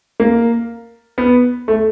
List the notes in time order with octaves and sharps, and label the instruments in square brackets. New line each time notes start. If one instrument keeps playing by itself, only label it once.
[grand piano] A#3
B3
A3